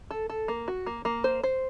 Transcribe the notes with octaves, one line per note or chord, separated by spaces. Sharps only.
A4
A4
A#3
F#4
A#3
A#3
C5
C5